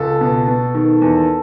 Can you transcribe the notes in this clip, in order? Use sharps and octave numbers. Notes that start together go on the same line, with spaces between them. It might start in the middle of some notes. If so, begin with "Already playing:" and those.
Already playing: C#2 A4
B2
B2
D#3
E2